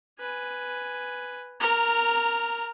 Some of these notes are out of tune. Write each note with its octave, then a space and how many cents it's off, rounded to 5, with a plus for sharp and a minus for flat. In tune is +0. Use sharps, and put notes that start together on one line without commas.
B4 +0 G#5 +0
A#4 +0 A#5 -20